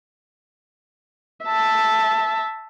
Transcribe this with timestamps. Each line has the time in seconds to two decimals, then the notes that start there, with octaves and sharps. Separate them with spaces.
1.45 E5 A5